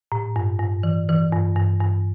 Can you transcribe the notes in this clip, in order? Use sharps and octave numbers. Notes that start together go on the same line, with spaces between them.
A2
G2
G2
E3
E3
G2
G2
G2